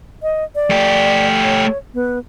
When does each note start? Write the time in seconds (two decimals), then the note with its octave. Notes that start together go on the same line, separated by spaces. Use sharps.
0.23 D#5
0.55 D5
0.70 A3 G4
1.44 C#5
1.94 B3